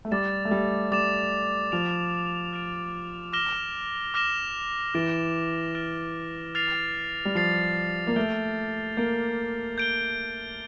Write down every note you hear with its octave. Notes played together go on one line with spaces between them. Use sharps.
A3
G3 D6 A6 E7
A3
G3
G3 D6 A6 E7
F3 F6 A6 D7 F7
F6 A6 D7 F7
D6 F6 A#6 E7 G7
D6 F6 A#6 E7 G7
E3 F6 A6 D7 G7
F6 A6 D7 G7
F6 A6 C7 F7
G3
F3 F6 A6 C7 F7
A#3
A3 G6 D7 G7
A#3 G6 D7 G7
G6 D7 G7